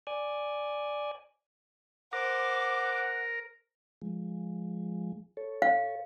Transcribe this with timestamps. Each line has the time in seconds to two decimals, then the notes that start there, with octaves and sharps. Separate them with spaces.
0.07 D5 G#5
2.13 A#4 C5 F#5 D6
4.02 F3 G#3
5.37 A4 C#5
5.62 F5